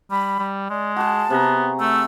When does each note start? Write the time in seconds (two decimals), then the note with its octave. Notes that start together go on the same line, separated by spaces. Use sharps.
0.11 G3 B5
0.39 G3
0.70 G#3 D5
0.96 F#4 G#4 A5
1.30 C3 B3 A#5
1.80 A3 E6